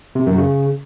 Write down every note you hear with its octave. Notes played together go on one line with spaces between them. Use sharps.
C3
F#2
C#3